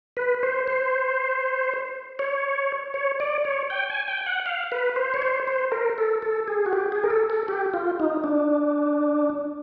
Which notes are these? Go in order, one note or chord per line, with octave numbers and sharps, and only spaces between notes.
B4
C5
C5
C#5
C#5
D5
C#5
G5
G#5
G5
F#5
F5
B4
C5
C#5
C5
C5
A#4
A4
A4
G#4
F#4
G4
G#4
A#4
A4
A4
G4
F4
D#4
D4